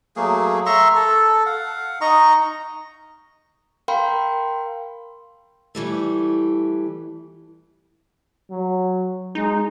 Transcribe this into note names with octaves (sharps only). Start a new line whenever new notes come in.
F#3 A3 A#3 G#4
E5 A#5 C6 C#6
A4
F5 F#5
D#4 D#5 A#5 C#6
A#4 F5 G5 B5 C6
E3 G3 A3
F#3
G#3 D#4